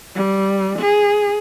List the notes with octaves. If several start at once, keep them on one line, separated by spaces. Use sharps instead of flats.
G3
G#4